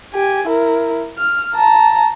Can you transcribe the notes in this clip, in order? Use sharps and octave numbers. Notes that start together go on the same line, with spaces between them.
G4 G#5
E4 A#4
F6
A5 A#5